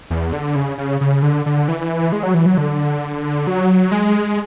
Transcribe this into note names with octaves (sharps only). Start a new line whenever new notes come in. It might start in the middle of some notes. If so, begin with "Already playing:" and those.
E2
D3
C#3
C#3
C#3
D3
D3
E3
G#3
F#3
E3
F#3
D3
F#3
G#3